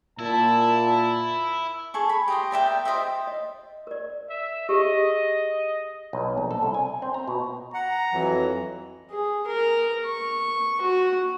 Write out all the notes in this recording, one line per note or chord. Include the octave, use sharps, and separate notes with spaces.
A#2 E4 A5
G#4 A4 C#6
B5
G4 D#5 C6
A#4 D5 E5 G5
G4 C5 D#5 E5
D#5
A#4 D5
E5
G4 G#4 D#5
B1
A#1
A4
C2
G#5
C4
A#5
B2
F#5 A#5
F2 E3 F#3
G#4
A#4
C#6
F#4